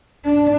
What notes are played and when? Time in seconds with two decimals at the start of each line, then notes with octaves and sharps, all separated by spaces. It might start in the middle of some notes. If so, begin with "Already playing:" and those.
0.25 D4